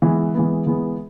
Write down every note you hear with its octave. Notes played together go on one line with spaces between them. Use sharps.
E3 G#3 B3
E3 G#3 B3
E3 G#3 B3